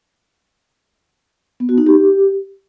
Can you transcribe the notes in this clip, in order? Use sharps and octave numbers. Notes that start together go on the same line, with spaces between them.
B3
F#4
D#4
G4